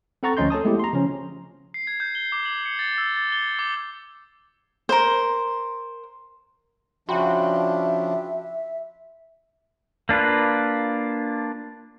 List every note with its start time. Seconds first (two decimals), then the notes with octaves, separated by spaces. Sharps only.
0.23 C4 A4 F#5 A#5 C#6 A6
0.37 D2 F3 C#4 D#5 C6 G6
0.50 A4 C#5 A5 D#6
0.65 G#3 A3 B3 E4 G4
0.79 A#5 C6
0.93 C#3 F3 C#4
1.74 C7
1.87 G#6
2.00 G6
2.15 G7
2.32 D6
2.45 F#7
2.65 C#7
2.79 A6
2.98 E6
3.16 A6
3.32 G7
3.59 D6
4.89 A#4 C5
7.09 C#3 F3 D4 F#4 E5 G5 B5 C6
10.09 A#3 D4 F4 B4